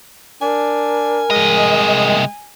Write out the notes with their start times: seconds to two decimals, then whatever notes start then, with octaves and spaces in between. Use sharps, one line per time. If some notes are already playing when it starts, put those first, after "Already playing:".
0.42 D4 A#4 G#5
1.30 C2 G#3 D#5